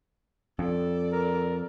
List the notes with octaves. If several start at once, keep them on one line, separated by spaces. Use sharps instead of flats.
F2 A4 D5
A#4